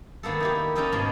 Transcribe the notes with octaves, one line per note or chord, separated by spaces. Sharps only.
D#3 G#3 A#3 B3 A4
D#4 E4 G4
C#4 D#4 G4 A4 A#4 D#5
G#2 B2 G#3 A#3 G#5